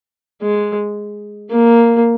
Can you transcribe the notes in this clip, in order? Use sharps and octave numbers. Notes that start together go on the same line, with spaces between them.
G#3
A#3